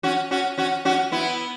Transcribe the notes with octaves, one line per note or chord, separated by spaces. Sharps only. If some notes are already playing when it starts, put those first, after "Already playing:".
C#4 F#4
C#4 F#4
C#4 F#4
C#4 F#4
B3 E4